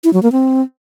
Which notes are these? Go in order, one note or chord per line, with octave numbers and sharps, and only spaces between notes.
E4
F#3
A#3
C4